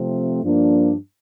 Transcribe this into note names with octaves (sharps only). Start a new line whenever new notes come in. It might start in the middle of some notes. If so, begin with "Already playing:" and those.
Already playing: C3 F3 A3 C4
G2 F3 A#3 D4